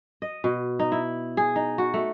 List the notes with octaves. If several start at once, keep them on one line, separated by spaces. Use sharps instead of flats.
D#5
B2
D#4
E4
G#4
D#4
F#4
A3